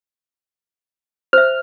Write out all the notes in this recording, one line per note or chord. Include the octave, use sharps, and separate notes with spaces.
C5 E5 F6